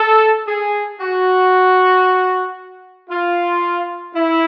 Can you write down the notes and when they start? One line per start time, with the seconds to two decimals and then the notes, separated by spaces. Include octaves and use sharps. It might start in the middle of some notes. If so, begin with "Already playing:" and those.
Already playing: A4
0.47 G#4
1.00 F#4
3.10 F4
4.15 E4